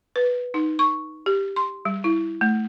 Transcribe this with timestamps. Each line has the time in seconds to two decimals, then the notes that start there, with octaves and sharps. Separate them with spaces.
0.16 B4
0.54 D#4
0.79 C#6
1.26 G4
1.56 C6
1.85 G3
2.04 E4
2.41 A3